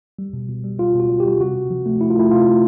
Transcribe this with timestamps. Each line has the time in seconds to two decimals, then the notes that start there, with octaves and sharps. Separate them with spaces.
0.19 G3
0.33 B2
0.49 B2
0.64 G3
0.79 G3 F4
0.95 B2 F#4
1.09 G3
1.20 G3 G4
1.40 C3 F#4
1.56 C3
1.70 F3
1.86 A3
2.01 A3 E4
2.10 F4
2.17 A3 E4
2.31 C3 F4
2.47 A3